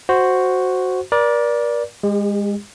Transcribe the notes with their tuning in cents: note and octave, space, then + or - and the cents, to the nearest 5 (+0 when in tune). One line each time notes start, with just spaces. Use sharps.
F#4 +0 C5 +0
A#4 +40 D5 -5
G#3 -25 G4 +35